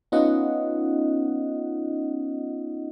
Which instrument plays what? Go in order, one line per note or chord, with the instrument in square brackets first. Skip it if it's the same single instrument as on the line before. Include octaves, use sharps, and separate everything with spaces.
[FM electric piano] B3 C#4 D#4 F4 D#5 F#5